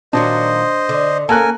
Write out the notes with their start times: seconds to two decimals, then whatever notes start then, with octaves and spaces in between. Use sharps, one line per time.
0.13 A#2 D#3 F#3 D4 C5 D#5
0.89 D3
1.29 A#3 C#4 A4 A#4 G#5 F#6